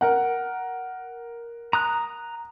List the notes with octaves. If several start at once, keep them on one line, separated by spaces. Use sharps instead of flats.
A#4 F#5
A#5 D#6 F#6